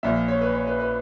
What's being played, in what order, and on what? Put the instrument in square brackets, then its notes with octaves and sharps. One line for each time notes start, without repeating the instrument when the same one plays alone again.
[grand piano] A#1 A#2 E5
C#5
B4
C#5
B4
B4